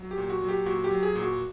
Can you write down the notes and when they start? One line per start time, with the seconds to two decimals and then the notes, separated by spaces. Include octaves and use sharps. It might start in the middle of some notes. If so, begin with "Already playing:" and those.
Already playing: F#3
0.11 G4
0.18 A#2
0.30 F#4
0.42 F#3
0.49 G4
0.66 A#2 F#4
0.84 G4
0.91 F#3
1.03 G#4
1.15 A#2
1.22 F#4